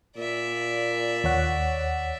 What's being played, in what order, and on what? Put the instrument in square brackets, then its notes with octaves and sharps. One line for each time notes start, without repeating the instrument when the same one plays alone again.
[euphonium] A#2 [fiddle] D5 E5
[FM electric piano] D#2 C#5 F#5